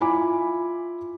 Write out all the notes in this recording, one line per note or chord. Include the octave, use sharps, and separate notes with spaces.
E4 F4 G#5 B5 D6